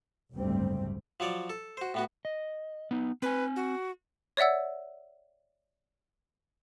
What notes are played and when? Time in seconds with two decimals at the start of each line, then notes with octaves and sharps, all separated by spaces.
0.33 F#1 D2 G#2 G3 A3 C4
1.20 F3 F#3 C#5 D5
1.50 A4
1.77 F#4 C5
1.94 A2 B3 F#4
2.25 D#5
2.91 B3 D#4
3.22 C4 B4 G#5
3.56 F#4
4.37 C#5 D5 E5 F#5 E6